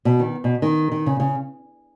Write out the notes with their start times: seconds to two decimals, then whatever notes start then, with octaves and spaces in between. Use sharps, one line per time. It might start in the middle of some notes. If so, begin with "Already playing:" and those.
0.05 B2
0.20 D#3
0.44 B2
0.62 D#3
0.92 D#3
1.06 C#3
1.20 C#3